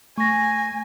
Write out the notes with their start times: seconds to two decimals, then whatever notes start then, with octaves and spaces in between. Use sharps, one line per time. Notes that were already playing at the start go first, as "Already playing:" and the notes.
0.18 A3 G#5 C#6 A#6